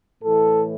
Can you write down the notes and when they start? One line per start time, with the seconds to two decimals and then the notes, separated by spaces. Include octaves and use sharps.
0.23 A2 E3 A4